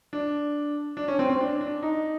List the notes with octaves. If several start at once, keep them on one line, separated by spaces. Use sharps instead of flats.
D4
D4
C#4
C4
C4
D4
D4
D#4